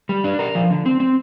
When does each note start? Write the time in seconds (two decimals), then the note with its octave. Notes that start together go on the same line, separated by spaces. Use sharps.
0.09 G3
0.24 D4
0.39 A#4
0.55 F3
0.70 D3
0.86 C4
1.00 C4